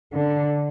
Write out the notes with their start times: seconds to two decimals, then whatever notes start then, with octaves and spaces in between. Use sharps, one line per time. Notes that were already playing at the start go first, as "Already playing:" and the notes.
0.13 D3